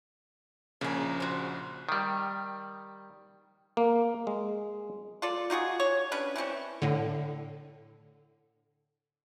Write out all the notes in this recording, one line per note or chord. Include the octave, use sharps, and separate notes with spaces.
A#1 C#3 A#3 G#5
F#4 C5
D#3 G3
A#3
G#3
F4 A4 D5
D#4 F4 F#4 G#4
C#5
C#4 D4 G4 B4
E3 A3 C4 C#4
A2 D3